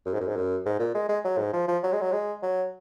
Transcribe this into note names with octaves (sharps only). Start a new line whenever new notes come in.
F#2
G#2
F#2
G#2
F#2
G#2
A#2
G#3
G#3
F#3
G#2
F3
F3
F#3
G#3
F#3
G#3
F#3